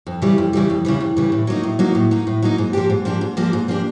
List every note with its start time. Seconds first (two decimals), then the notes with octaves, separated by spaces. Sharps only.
0.07 F2
0.22 C#3 E3 G3
0.38 F2
0.53 C#3 E3 G3
0.70 F2
0.85 C#3 E3 G3
1.00 F2
1.17 C#3 E3 G3
1.32 A2
1.47 F#3 A#3 D#4
1.63 A2
1.79 F#3 A#3 D#4
1.95 A2
2.11 F#3 A#3 D#4
2.27 A2
2.42 F#3 A#3 D#4
2.58 G#2
2.73 F3 A#3 D4 G4
2.90 G#2
3.05 F3 A#3 D4 G4
3.21 G#2
3.37 F3 A#3 D4 G4
3.53 G#2
3.68 F3 A#3 D4 G4